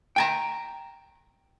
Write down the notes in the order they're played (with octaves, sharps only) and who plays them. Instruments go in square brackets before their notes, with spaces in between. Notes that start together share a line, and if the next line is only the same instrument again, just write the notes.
[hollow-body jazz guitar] G5 G#5 A#5